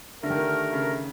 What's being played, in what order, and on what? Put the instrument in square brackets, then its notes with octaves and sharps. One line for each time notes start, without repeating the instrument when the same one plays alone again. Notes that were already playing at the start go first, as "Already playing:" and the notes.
[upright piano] D3 [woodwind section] A3 D4 G4 A#4
[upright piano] D#3
D3
C#3